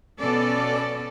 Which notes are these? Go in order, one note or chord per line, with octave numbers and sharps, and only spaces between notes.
B2 B3 C#4 A4 D5